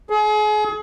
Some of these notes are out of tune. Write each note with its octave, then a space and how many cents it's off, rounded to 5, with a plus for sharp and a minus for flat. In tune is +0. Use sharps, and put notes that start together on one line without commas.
G#4 +35